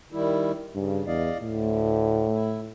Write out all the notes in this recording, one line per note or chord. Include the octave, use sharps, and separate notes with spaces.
D#3 G3 E4
G2 C#3
E2 D5 D#5 F5
D2 A2
E4